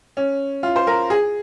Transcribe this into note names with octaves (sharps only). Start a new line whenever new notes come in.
C#4
F4
C5
A#4
G#4